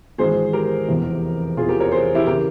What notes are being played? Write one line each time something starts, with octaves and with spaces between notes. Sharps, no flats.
G#1 G#2 E3 G#4 C5
G4 A#4
F1 E2 C3 E3
F1 E2 E3 F4 G#4
G4 A#4
A#4 C#5
G#4 C5
E4 G4
C#3 E3 G4 A#4